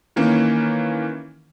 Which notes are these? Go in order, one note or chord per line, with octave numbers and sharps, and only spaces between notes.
D#3 E3 A#3 C#4